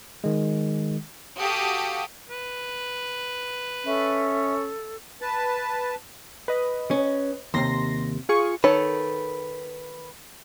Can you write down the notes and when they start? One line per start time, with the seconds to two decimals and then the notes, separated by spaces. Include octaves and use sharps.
0.24 D#3 G#3
1.38 F#4 G4 A4 F5 D#6
2.30 B4
3.86 C#4 A4 E5
5.21 B4 A5
6.48 B4 D#5
6.91 C#4
7.54 D#2 C3 C6 A#6
8.29 F4 G#4 C#6
8.64 D#3 A4 B4 C#5